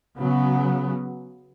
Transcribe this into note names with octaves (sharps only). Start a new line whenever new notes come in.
C#3 F#3 B3